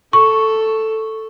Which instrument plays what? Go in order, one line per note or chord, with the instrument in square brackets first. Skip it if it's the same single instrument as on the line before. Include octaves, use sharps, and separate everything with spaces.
[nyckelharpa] A4 [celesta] C#6